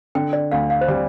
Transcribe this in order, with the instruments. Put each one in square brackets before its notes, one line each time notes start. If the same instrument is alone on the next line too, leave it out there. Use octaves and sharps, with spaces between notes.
[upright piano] D3 [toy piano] G5
[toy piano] D5
[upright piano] D2 [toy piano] F5
[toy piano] F5
C5
[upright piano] G3 [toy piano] D5